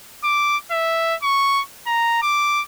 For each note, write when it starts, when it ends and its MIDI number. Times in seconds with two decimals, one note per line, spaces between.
0.24 0.57 86
0.71 1.15 76
1.23 1.61 85
1.87 2.20 82
2.22 2.61 86